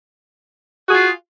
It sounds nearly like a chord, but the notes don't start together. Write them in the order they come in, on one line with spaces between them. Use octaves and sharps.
F#4 G#4 F4